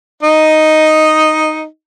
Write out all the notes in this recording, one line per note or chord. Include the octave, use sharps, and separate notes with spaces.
D#4 D#5